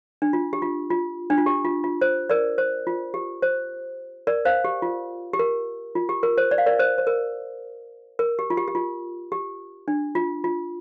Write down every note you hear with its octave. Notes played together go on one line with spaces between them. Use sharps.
D4
F4
G4
F4
F4
D4
F4
G4
F4
F4
C5
A#4 D5
C5
F4
G4
C5
A#4 D5
C5 F5
G4
F4
G4
A#4
F4
G4
A#4
C5
D5
F5
A#4 D5
C5
C5
A#4
A#4
G4
F4
G4
G4
F4
G4
D4
F4
F4